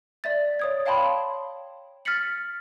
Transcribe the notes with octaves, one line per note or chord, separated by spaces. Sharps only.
D5 E5 A6
C#5 D#6 G#6
C#5 F5 G5 A5 B5 C6
F6 A6 B6 C#7 F#7